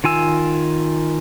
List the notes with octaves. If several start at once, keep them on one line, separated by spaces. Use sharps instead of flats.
D#3 F4 G#5 E6